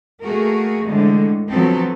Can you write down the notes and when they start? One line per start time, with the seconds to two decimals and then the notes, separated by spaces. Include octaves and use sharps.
0.22 A3 A#3 F#4 G#4 A#4
0.85 A2 D3 E3 G#3
1.48 F3 F#3 B3 C4 A4 B4